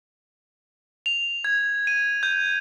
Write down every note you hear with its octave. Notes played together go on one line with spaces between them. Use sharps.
F7
G#6
D#7
G6